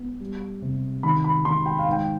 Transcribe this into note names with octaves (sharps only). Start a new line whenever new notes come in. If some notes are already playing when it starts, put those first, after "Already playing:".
Already playing: B3
G3
C3
D#3 B5
B5
D#3 C6
G5
F5
G#2
G5